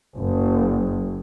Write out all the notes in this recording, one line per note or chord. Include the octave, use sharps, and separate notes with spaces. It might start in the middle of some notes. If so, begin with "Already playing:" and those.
F#1